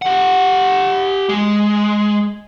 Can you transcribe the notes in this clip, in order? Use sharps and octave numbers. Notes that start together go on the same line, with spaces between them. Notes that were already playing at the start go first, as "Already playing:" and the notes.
G4 F#5
G#3